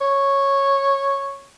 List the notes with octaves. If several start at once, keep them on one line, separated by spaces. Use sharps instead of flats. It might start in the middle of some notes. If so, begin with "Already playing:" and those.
C#5